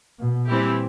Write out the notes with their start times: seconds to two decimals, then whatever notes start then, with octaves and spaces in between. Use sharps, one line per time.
0.20 B2
0.47 A#2 E3 G3 C4 E4 G4